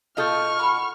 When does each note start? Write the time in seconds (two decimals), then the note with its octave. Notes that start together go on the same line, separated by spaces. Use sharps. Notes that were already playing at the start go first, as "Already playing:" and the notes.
0.17 B2 F4 A4 D#5 C#6 D#6 F6 G6
0.59 F#5 B5